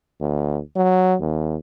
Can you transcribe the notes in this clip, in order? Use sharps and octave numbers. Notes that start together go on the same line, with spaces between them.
D2
F#3
D#2